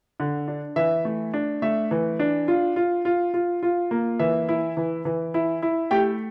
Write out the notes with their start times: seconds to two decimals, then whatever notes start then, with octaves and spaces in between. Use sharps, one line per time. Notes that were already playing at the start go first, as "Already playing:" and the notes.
0.20 D3
0.48 D4
0.76 E3 E5
1.05 A3
1.34 D4
1.62 A3 E5
1.91 E3
2.19 D4
2.48 F4
2.76 F4
3.05 F4
3.34 F4
3.63 F4
3.91 A#3
4.19 E3 E5
4.49 E4
4.77 E3
5.05 E3
5.34 E4
5.62 E4
5.91 A3 G4 G5